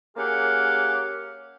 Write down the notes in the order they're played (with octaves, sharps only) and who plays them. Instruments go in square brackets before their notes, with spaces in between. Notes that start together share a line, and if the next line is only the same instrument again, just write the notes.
[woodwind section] A#3 C#4 G4 G#4 F5 F#5